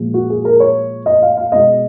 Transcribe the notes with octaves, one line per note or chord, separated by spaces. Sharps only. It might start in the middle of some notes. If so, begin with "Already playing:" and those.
Already playing: A#2 F3 G#3
F#4
G#4
A#4
C#5
D#5
F5
F5
B2 G#3 B3 D#5